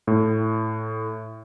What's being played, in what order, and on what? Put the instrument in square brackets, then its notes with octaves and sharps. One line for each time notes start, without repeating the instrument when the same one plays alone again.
[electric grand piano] A2